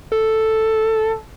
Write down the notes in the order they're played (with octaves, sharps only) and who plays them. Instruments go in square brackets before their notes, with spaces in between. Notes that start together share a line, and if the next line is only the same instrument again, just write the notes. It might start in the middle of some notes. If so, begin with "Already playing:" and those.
[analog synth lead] A4